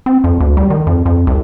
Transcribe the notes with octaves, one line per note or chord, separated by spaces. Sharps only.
C4
F2
D2
G3
D#3
F2
F2
C2